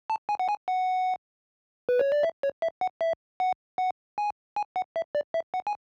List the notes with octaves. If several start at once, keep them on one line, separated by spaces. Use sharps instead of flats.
A5
G#5
F#5
G#5
F#5
B4
C#5
D5
E5
C#5
E5
F#5
E5
F#5
F#5
G#5
G#5
F#5
E5
D5
E5
F#5
G#5